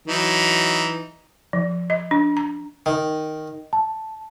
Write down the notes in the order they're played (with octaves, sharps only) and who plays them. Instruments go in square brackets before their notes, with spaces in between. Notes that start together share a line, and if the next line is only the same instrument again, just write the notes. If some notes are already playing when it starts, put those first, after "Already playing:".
[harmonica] E3 F#3 D#4
[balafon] F3
D#5
D4
A#5
[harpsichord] D#3
[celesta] A5